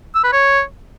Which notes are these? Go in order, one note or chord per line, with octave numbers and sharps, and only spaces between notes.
E6
B4
C#5